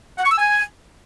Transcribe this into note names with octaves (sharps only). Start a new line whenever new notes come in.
F#5
C#6
E6
G#5